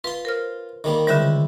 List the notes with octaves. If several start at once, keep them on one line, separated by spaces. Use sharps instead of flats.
F4 B4 C6
A#4 C5 F6
D#3 G3 A#3
C#2 D3 D#3 G3 E4 C5